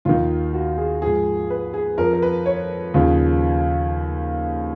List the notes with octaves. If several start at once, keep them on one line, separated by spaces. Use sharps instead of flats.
D#2 D#3 F4
F#4
G#4
G#2 F3 G#4
B4
G#4
F2 F3 A#4
A#4
B4
C#5
D#2 C#3 F3